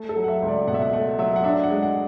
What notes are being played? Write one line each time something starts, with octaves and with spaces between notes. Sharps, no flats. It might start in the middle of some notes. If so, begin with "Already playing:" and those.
Already playing: A3
A4
F#3
F#5
E5
C#2
D5
B2 F#5
E5
F#5
A3 F#5
F#3 E5
F#5
D4 E5
F#5
G#3
F#5